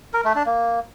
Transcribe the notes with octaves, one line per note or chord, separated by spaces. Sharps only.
A#4
A3
D4
A#3